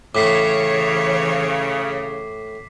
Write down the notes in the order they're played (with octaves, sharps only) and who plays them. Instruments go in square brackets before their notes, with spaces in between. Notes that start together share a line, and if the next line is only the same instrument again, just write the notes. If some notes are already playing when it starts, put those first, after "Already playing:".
[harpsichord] A2 [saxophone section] C#3 [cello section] E3 C#5 [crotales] D6 B6 C7